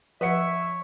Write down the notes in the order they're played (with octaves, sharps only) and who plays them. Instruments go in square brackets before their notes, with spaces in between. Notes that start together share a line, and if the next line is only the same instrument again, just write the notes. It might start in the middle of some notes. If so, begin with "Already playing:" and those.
[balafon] F3 F#5 [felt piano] B4 C#7 [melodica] C#5 [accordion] E5